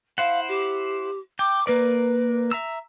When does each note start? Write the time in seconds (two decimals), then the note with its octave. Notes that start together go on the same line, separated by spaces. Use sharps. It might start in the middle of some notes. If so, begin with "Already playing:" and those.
0.18 E4 C5 F5 F#5
0.49 G4
1.39 G5 D6
1.67 A#3 A#4 B4 D5
2.51 E5 A#5 E6